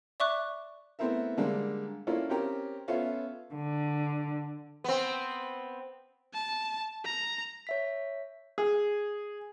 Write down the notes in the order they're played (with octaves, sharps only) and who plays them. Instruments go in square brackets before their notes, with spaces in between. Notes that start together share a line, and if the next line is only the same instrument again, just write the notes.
[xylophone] D5 E5 C#6 D6 F#6
[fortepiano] A3 B3 C4 E4 A#4 E5
D3 G3 G#3 A#3 D4
A#3 C#4 D4 E4 F4 A4
C4 C#4 G4 A#4
B3 C#4 F4 A4 E5 F5
[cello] D3
[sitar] B3 C4
[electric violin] A5
A#5
[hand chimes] C#5 E5 B6
[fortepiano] G#4